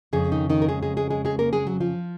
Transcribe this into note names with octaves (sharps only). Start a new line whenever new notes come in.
F2 C#3 G#3 G#4
D#3 D#4
D#3 D#4
A#4
G#3 G#4
G#3 G#4
G#3 G#4
G#3 G#4
G#3 G#4
A#3 A#4
G#3 G#4
F#3 F#4
F3 F4